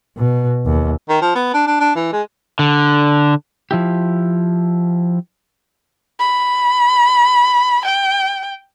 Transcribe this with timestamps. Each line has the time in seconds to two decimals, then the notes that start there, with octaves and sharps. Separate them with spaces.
0.17 B2
0.65 D#2
1.09 D#3
1.21 F3
1.35 B3
1.54 D4
1.67 D4
1.80 D4
1.95 E3
2.13 G#3
2.59 D3
3.71 F3 E4 G4
6.20 B5
7.85 G5